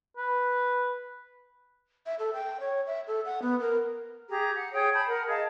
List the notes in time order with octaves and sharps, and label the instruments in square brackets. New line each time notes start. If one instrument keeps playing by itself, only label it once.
[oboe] B4
[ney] E5
A4
G5
C#5
E5
A4
F#5
B3
A#4
[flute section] G4 G#4 A#5
F#5
G#4 C#5 G5 D#6
A5 B5 G6
A#4 F#5
G#4 D#5 F5 A5